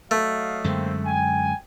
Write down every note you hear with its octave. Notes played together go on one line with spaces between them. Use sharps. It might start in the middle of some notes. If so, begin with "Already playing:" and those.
F#3 A3 D#5 F5
F#2 D3 G#3 A#3 C4
G5 G#5